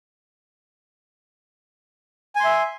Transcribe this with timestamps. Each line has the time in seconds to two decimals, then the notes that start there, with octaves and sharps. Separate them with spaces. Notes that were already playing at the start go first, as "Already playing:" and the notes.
2.36 G#5
2.40 C6
2.45 E5